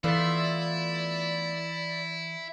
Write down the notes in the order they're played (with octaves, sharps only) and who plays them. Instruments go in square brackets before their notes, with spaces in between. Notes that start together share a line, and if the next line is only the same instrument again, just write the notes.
[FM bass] E3 [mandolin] A3 B3 F4 [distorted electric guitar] E4 [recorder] D5